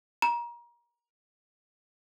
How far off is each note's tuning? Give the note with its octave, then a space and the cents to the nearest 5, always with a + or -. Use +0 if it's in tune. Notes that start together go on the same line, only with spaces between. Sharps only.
A#5 +30